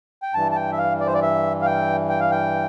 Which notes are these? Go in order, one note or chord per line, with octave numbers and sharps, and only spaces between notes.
G5
G2 E3 A5
A5
G5
E5
F5
D5
C5
D5
E5
F5
G5
G5
F5
G5